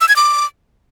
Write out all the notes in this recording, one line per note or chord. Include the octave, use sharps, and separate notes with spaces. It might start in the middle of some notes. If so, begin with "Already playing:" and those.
E6
G#6
D6